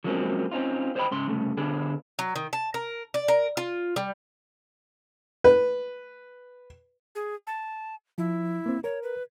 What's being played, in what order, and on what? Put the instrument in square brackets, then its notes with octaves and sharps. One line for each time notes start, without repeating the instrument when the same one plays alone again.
[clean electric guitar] F3 F#3 G#3 A#3 C4 C#4
C4 C#4 D#4 F4
C5 C#5 D#5 G5 B5
G#2 C#3 C6
C2 F2 C#3 A3
D3 B3 D4 G#4 A4
[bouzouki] F#3
D#3
A5
A#4
D5
A#4
F4
G3
[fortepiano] B4
[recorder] G#4
A5
[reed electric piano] F3 [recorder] E4
[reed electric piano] A#3 C4
[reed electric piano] A#4 [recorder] C#5
[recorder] B4